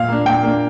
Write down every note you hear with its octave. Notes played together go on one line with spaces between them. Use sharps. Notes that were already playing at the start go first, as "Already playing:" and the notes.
Already playing: A#2 F5
A#3 D4
A#2 G5
A#3 D4